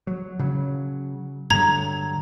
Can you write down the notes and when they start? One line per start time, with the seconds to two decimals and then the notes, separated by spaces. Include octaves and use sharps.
0.07 F#3
0.39 C#3 F#3
1.50 G2 D3 F#3 A#5 G#6